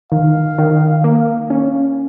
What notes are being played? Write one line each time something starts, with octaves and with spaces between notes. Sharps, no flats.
D#3 F5
D#3
A#3
C#4